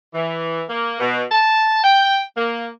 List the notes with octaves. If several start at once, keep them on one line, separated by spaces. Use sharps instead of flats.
E3
A#3
B2
A5
G5
A#3